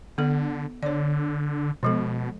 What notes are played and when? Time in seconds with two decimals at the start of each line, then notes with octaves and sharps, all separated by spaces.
0.18 D3 B3 A4
0.83 D3 C#5 D5
1.83 B2 F3 G#3 A4